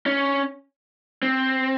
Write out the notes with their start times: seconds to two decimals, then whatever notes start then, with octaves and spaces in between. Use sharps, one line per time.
0.06 C#4
1.23 C4